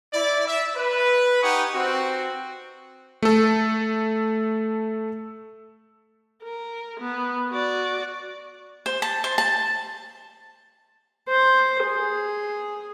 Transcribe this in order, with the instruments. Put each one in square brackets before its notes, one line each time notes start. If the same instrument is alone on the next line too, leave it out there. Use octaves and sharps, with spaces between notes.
[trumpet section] E4 D5
E5
B4
D#4 G4 F#5 G#5 C#6 D#6
C4 F#4
[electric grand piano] A3 A4
[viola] A#4
B3
F#4 D5
[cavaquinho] C5
A5
C5
A5
[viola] C5
G#4